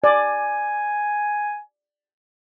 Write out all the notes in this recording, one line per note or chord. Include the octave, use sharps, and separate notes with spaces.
D5 G#5